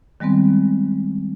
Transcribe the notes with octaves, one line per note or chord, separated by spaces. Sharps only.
D#3 G3 G#3 B3 C4